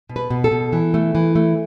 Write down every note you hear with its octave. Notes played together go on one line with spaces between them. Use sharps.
B2
B4
B2
A4
B2
E3
A3
E3
A3